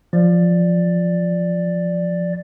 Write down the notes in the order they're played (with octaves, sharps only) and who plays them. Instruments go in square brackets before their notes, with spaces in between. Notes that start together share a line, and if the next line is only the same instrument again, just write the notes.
[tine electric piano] F3 [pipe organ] D5